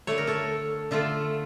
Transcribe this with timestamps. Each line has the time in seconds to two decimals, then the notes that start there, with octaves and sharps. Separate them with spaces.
0.07 D3 A3 C#5
0.18 A#4
0.27 A4 C#5
0.91 D3 A3 F4 A4